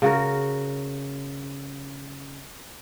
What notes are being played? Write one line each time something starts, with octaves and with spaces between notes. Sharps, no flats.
C#3 F#4 A#4